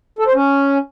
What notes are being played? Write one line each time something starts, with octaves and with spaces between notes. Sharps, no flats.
A4
C5
C#4